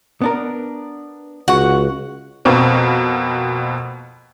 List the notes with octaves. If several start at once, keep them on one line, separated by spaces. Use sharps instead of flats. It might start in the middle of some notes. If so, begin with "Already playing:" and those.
B3 D4 A#4
C#2 F#4 F#5 C#6
F2 B2 A#3 C4